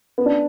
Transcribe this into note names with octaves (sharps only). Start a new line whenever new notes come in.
B3
D4